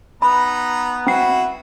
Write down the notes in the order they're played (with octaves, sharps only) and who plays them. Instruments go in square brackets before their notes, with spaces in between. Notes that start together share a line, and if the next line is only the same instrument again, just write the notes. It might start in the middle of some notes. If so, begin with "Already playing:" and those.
[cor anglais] B3 [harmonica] D#4 B4 A#5 [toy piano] B5
[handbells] C4 C7 [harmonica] E4 B4 [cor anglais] F#4